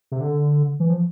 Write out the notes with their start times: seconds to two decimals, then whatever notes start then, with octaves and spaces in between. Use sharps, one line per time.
0.11 C3
0.20 D3
0.80 E3
0.90 F3